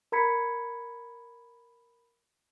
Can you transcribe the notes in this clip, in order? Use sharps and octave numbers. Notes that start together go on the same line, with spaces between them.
A#4 A#5 B5 G#6 B6 C#7